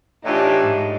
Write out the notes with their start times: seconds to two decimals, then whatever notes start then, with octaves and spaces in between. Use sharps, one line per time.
0.24 A2 E3 D4 D#4 F4 G4
0.62 G#2 G#3